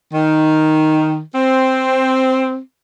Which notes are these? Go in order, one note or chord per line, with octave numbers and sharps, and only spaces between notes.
D#3
C4